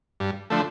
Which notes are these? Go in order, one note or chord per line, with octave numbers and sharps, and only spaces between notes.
G2
D3 F3 A3